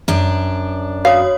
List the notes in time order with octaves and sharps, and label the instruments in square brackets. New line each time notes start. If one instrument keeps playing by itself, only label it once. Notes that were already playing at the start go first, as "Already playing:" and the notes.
[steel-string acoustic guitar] F#2 D4
[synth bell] F#4 C#5 D#6 [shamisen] F5